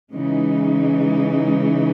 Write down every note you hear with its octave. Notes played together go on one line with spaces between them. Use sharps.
C#3 E3 G#3 D#4